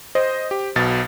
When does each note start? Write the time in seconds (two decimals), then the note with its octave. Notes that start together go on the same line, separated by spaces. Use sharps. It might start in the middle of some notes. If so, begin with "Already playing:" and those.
0.15 C5 D#5
0.51 G4
0.76 B1 B2 A6